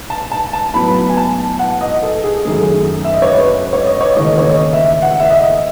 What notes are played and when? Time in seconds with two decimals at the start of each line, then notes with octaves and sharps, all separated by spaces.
0.10 A5
0.32 A5
0.53 A5
0.74 A2 F#3 B3 B5
1.09 G#5
1.17 A5
1.59 F#5
1.81 D#5
2.03 A4
2.24 G#4
2.45 F#2 D#3 A3 G#4
3.05 E5
3.14 D#5
3.22 C#5
3.31 B4
3.73 C#5
3.87 D#5
4.01 C#5
4.16 D#2 C#3 E3 A3 D#5
4.38 C#5
4.45 D#5
4.73 E5
5.02 F#5
5.20 E5
5.30 D#5